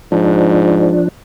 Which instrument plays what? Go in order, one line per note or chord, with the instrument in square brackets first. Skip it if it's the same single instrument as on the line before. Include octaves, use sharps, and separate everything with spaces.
[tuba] G#2 [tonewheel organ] F3 D4